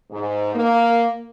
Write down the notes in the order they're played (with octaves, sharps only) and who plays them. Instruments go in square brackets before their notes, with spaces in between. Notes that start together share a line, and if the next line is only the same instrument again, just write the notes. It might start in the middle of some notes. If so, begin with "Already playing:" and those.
[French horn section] G#2
A#3